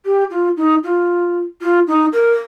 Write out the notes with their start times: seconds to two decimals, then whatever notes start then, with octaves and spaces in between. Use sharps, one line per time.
0.06 G4
0.30 F4
0.57 D#4
0.84 F4
1.61 F4
1.87 D#4
2.13 A#4